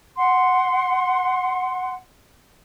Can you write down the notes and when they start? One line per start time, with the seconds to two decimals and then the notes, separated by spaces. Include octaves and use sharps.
0.16 F#5 C6